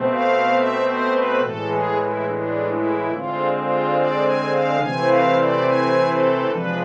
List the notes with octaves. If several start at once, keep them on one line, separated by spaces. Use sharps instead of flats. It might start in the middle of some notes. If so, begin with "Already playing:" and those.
Already playing: B2 A3 C4
F5
E5
C5
B4
A2 E3 G#3 A4
G#4
E4
D4
E4
D3 G#3 C4 F4
F4
D5
G#5
F5
C3 E3 A3 C4 G#5
F5
D5
G#5
A4
C3 F3 G#3 D4 B4